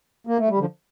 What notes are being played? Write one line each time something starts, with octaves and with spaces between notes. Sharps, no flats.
A#3
A3
G3
D3 F3